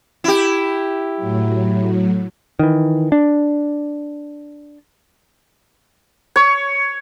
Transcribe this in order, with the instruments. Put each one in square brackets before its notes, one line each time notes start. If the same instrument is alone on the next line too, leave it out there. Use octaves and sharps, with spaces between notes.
[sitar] E4 G4
[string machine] A2 F#3
[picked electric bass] D#3 E3
D4
[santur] C#5